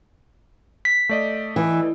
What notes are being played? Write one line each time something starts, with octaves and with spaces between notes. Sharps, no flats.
B6
A3 D5 D#5
E3